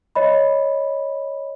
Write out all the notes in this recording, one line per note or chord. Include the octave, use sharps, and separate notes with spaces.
C#5 D#5 B5